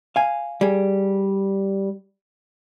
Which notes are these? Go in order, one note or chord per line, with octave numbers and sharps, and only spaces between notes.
F5 G#5
G3 G#4